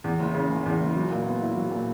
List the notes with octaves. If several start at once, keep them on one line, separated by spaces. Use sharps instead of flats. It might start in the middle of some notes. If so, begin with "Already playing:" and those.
E2
F#1
C#3
F#1
E2
F#1
F#3
A#2
B3
E4
F#3
A#2